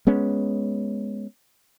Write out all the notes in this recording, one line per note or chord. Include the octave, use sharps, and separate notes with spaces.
G#3 B3 C#4